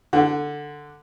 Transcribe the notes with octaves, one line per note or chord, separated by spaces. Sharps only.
D3